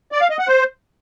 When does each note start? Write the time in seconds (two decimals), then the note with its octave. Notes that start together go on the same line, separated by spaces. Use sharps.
0.12 D5
0.21 F5
0.30 D#5
0.39 F#5
0.48 C5